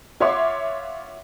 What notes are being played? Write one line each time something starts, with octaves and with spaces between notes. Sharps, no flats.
F4 C#5 E5 F#5 C6 D6